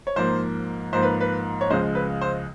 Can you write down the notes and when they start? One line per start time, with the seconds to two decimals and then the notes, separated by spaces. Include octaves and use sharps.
0.07 C#5
0.16 G#2 F3 A#3 C5
0.93 G#2 F3 A#3 C5
1.03 B4
1.21 B4
1.61 C#5
1.70 C#2 C#3 F3 G#3 C5
1.95 B4
2.21 C5